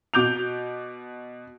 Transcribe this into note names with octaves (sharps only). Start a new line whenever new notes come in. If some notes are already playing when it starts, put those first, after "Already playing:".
B2 D6 G6 F7